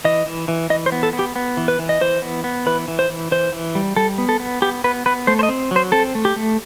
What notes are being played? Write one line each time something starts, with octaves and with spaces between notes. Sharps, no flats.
E3 D#5
E3
E3
E3 D#5
C5
B3
A4
B3
G4
B3
E3
B4
E3
D#5
E3 C5
B3
B3
E3 B4
E3
C5
E3
E3 C5
E3
G3
G3 A4
B3
A4
B3
B3 G4
B3 B4
B3 B4
A3 C5
C5
D#5
C4
F#3 C5
C4 A4
A3
G4
A3